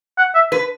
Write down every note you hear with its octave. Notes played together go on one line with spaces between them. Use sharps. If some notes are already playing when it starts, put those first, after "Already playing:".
F#5
E5
B4